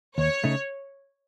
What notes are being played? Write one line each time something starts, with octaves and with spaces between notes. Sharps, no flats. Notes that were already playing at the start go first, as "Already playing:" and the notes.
D#2 C#5
C#3 A3 D#4